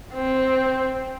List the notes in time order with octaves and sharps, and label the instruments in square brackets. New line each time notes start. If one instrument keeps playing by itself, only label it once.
[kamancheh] C4